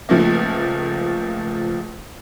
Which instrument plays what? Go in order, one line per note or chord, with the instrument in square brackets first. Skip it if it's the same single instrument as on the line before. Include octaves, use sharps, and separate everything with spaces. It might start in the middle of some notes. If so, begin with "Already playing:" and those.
[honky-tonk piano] C#2 F3 A3 A#3